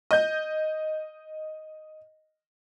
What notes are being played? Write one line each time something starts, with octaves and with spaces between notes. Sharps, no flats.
D#5 G6